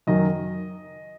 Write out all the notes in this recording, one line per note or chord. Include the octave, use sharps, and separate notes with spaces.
F#2 D#3 F#3 D#5